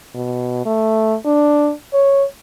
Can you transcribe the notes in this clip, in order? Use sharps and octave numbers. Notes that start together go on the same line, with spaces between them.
B2
A3
D4
C#5